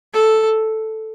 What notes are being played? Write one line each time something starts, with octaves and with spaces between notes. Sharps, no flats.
A4